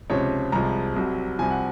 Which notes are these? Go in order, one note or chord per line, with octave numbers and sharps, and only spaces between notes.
C#2 C3 F3 C#5
C2 C3 F3 G#3 A#5
C2 C3 F#3
C2 C3 F3 G#5
F#5